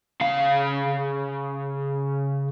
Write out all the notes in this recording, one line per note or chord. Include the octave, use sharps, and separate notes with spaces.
C#3 F5